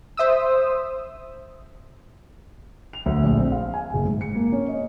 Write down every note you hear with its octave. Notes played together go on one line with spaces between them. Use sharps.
C5 E5 D#6 E6
F7
D2
A#1
C4
F5
G#5
F#1
G#2
C#7
A#3
C#4
D#5